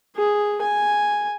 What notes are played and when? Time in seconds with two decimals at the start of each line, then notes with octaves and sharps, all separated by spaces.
0.16 G#4
0.63 G#5